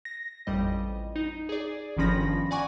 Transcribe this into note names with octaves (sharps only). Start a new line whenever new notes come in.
A#6
A1 F2 G3 D#5
D#4
G#4 D5
G1 D#3 F3 C#4 B5 A#6
D5 F#5 G#5 A#5 C#6 D6